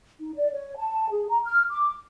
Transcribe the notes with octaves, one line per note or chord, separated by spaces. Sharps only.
D#4
D5
C#5
A5
G#4
A#5
F6
D6